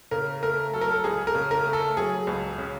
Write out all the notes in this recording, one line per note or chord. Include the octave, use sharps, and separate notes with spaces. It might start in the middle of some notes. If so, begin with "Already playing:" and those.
C#3 A#4
A3 A#4
F#3 A4
A#4
A4
C#2 G#4
A#4
C#3
A#4
A3
A4
F#3 G#4
C#2
C#3